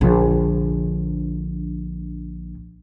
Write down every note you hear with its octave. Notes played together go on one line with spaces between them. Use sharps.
A#1 D3